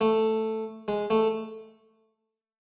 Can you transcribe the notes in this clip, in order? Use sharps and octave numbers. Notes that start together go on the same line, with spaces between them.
A3
G#3
A3